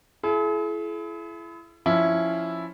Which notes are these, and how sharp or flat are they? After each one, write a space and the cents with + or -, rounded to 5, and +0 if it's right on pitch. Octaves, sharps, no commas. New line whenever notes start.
E4 +30 G#4 +45
F3 -5 C#4 +0 E4 +0